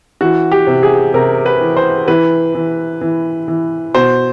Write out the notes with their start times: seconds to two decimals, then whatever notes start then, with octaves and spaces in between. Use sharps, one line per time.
0.21 E3 F#4
0.52 G4
0.67 C3
0.83 G#4
1.14 C3 A#4
1.46 B4
1.61 E3
1.77 C5
2.08 E3 B4
2.55 E3
3.01 E3
3.48 E3
3.94 B2 C5